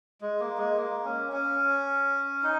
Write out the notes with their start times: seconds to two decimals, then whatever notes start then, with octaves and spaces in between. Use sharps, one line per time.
0.21 G#3
0.40 A#3
0.58 G#3
0.77 A#3
1.05 C#4
1.32 C#4
2.43 D#4